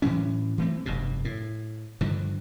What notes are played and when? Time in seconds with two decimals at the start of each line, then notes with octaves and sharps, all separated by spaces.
0.02 A2 E3 F#3 C#4
0.58 E3 A3 C4
0.86 F1 G2 B2
1.25 A2
2.01 G2 D3 D#3 F3